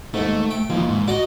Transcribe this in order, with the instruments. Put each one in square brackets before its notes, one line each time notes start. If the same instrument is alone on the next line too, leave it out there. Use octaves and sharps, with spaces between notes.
[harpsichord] D#2 G#2 [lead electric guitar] A3
[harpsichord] G5
[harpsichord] D#2 [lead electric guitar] E3 F3
[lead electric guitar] G#2
[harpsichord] F#4 A#5 [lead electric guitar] D5 D#5